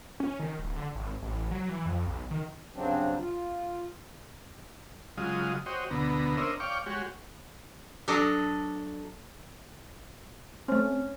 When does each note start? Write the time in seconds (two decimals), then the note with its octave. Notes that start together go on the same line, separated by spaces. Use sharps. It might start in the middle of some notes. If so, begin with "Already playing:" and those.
0.20 C#4
0.40 D#3
0.59 D1
0.76 D3
0.95 G#1
1.22 A1
1.51 F#3
1.69 E3
1.86 F2
2.06 B1
2.31 D#3
2.76 G2 C#3 F#3 C4 D4
3.18 F4
5.17 C#3 F#3 G#3 F4 D#5
5.66 F#4 C5 C#5 D#5 G5
5.91 D2 B2 D3 B3 A#5
6.37 C#4 D4 A#4 C5 D#5 E5
6.60 C#5 D5 F5 G5 C#6 D6
6.86 G#3 F#4 G4 C#5
8.08 F#3 D4 A4 D5 D#5
10.68 A3 C4 C#4